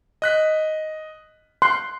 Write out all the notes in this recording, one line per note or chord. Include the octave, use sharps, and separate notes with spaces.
D#5 F#6 B6
C6 F#6